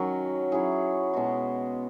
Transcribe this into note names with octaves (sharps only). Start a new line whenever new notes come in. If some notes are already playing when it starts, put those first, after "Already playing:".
Already playing: D#3 F#3 C#4 F#4
F#3 C#4 E4 G#4
B2 G#3 B3 F#4